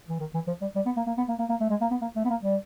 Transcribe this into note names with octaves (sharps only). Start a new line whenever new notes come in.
E3
D#3
E3
F3
G3
G3
B3
A#3
A#3
B3
A#3
A#3
A#3
A3
G#3
A#3
B3
A#3
A3
B3
A#3
G3